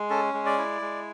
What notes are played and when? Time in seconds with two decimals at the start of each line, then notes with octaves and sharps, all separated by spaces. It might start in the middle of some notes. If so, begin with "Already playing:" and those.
Already playing: G#3
0.10 C#4 A4
0.34 G#3
0.46 D5
0.58 E4
0.81 G#3